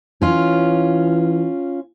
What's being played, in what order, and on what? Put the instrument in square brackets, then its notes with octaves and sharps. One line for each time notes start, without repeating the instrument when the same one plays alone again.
[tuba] E3 [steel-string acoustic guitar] C#4 F4